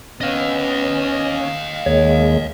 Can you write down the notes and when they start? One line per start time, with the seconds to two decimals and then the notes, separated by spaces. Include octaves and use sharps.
0.21 B3 C#4 D#5 F5
1.86 D#2 G#3 A#3 C#5